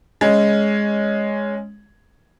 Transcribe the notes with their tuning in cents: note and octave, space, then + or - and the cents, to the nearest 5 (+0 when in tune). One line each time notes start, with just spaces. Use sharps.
G#3 +0 C#4 +5